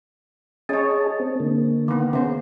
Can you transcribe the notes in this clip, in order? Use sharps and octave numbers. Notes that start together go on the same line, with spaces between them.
C#4 G#4 C#5 D#5 A5
C4
D3 A#3
D#3 B3
C#3 B3 C5